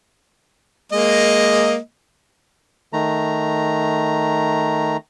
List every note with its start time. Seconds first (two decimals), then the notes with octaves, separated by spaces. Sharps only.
0.92 G#3 A#3 D#5
2.93 D#3 A3 A#5